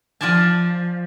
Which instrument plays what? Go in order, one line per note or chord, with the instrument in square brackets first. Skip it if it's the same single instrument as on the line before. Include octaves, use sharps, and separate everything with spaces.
[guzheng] F3 F4 D5 G#5 A5